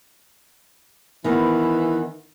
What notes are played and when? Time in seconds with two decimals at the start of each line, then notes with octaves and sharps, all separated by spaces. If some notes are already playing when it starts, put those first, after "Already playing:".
1.24 D#3 E3 B3